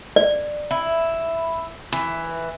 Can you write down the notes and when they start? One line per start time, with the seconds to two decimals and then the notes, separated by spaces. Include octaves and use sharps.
0.16 D5
0.71 E4
1.93 E3